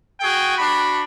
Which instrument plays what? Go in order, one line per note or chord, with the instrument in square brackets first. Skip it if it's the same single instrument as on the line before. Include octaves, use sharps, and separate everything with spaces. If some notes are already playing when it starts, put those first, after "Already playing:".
[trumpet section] F#4 G#4 G5
D4 F#4 B5